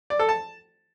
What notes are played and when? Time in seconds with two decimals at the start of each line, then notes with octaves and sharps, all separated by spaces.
0.10 D5
0.19 A4
0.29 A5